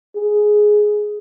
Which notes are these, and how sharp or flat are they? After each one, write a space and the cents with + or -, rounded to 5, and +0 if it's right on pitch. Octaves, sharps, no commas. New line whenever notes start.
G#4 +10